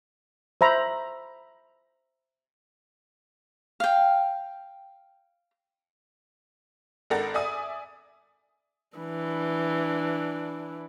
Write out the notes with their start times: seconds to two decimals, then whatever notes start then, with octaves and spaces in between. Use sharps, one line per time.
0.61 C5 E5 A#5 B5
3.80 F5 G5
7.10 G#1 D4 A4 A#4 F#5 A6
7.34 D5 E5 G#5 D#6
8.97 E3 D4